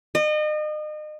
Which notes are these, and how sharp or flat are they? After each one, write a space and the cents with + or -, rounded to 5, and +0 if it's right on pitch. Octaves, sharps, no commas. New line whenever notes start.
D#5 -35